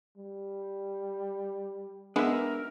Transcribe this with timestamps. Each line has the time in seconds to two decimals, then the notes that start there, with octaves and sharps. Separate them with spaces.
0.17 G3
2.16 G#3 B3 D4 A#4 E5